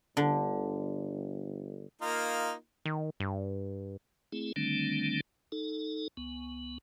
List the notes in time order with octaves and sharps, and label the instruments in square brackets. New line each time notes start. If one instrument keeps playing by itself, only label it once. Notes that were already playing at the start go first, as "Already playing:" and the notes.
[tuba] G1 [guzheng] D3
[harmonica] A#3 D#4 F4
[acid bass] D#3
G2
[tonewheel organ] A3 C4 E4 G#4
D3 D#3 G3 A3 C4 D4
D#4 A4
C#2 B3